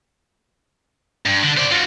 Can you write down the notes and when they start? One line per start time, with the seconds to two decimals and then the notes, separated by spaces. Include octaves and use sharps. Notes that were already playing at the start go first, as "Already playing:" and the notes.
1.26 G2
1.43 D3
1.57 C5 D5
1.72 F4 F#4